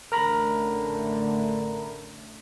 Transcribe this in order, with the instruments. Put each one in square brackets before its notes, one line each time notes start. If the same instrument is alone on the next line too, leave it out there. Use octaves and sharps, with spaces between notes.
[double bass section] A1 D3 A3 [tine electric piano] A#4 A#5 B5